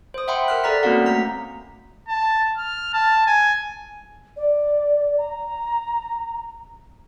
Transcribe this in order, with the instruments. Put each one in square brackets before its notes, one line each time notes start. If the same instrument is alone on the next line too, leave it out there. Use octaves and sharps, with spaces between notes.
[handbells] C5 D#6
E5 F#5 G5 B5 C6
A#4 F6 F#6
A4 D5 A#5 F6 B6
A#3 C4 C#4 F#4 F5 F#5
A3 A#5 B6
[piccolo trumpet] A5
F6
A5
G#5
[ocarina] D5
A#5